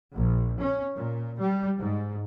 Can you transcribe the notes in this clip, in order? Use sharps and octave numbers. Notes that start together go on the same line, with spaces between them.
A#1
C#4
A#2
G3
G#2